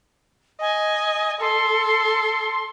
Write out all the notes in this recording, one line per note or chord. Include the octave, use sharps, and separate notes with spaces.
D#5 G#5
A4 C6